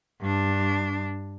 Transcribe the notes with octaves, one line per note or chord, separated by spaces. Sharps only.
G2 D4